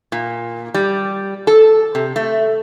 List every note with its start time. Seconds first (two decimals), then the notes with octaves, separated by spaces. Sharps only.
0.12 A#2
0.74 G3
1.47 A4
1.95 C3
2.16 A3